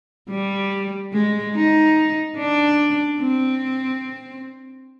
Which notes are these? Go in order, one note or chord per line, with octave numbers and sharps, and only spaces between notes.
G3
G#3
D#4
D4
C4